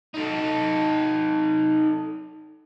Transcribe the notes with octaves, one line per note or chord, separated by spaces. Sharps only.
D#4 A4